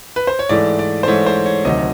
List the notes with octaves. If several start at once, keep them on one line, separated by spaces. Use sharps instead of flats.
B4
C5
C#5
G#2 E3 A3 D5
D5
C5
G#2 E3 A3 C#5
C5
C#5
D2 C3 D#3 F#3 D#5